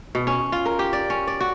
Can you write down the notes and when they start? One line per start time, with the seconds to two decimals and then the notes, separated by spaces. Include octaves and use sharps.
0.15 B2
0.27 C#4
0.52 F4
0.66 A#4
0.79 G4
0.93 D5
1.10 C#4
1.27 D5
1.40 F#4